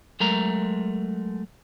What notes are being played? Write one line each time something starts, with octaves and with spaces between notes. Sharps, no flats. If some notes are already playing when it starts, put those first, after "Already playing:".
F#3 G#3 A3 A#4 A#5